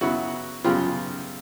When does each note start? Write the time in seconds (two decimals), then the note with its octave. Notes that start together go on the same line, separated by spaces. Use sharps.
0.01 F#2 C#3 F#3 B3 E4 F#4
0.64 F#2 C#3 F#3 B3 F4 G4